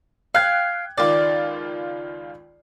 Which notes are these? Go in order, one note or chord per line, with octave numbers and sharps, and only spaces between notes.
F5 G5 F#6 G#6
C#2 D#3 F4 D5